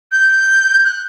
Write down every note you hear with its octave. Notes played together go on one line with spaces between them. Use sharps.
G6
F#6